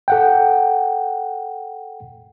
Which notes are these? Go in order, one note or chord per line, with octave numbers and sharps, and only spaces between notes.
A4 F#5 G5